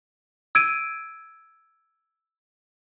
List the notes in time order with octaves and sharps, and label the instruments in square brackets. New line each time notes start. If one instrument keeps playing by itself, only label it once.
[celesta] E6 G#6 D7 D#7